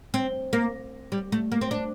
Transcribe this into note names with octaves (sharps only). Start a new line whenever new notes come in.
C4
A#3
G3
A3
A#3
C4
D4